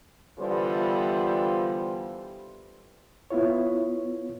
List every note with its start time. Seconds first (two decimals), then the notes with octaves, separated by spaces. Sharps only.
0.39 D3 E3 G3 B3 F4 C5
3.31 B3 E4 F4 C#5